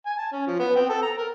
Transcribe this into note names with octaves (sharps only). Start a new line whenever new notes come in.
G#5
A5
C#4
F3
B3
C4
A4
A#5
A#4